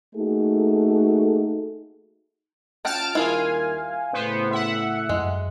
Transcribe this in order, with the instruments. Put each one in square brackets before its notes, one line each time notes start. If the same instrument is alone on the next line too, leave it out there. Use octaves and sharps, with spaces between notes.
[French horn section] A3 A#3 D#4 F#4 G#4 A4
[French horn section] C#4 F4 [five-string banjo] F#5 G5 [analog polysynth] A5 F6 D7
[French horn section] D#2 G3 A#4 [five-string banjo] E4 F4 G#4 [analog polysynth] F5 G#5
[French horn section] A2 C#3 [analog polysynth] B3 C5
[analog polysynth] E5 F#5
[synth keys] F#2 [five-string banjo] G#3